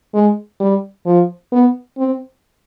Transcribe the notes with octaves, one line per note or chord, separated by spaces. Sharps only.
G#3
G3
F3
B3
C4